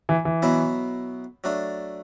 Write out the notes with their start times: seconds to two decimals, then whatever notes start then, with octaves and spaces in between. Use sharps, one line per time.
0.09 E3
0.25 E3
0.42 B2 F#3 B3 E4
1.44 F#3 A3 D4